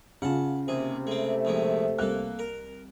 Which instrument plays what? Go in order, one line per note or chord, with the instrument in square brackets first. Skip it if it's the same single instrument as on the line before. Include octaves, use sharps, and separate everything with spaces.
[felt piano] C#3 F4 [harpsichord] F#5 A5
[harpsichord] D#2 G#4 [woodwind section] C3
[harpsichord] G#3 C4 [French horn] A3
[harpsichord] A#1 D#3 G#3
[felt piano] C2 F#6 [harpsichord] A#3 A4
[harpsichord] A#4